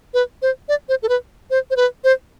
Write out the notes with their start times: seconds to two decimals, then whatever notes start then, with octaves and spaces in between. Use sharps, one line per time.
0.14 B4
0.42 C5
0.69 D5
0.89 C5
1.03 A4
1.09 B4
1.51 C5
1.70 C5
1.76 B4
2.04 C5